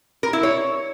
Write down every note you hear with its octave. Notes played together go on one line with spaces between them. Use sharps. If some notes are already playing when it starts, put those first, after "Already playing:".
A#4
E4
C#5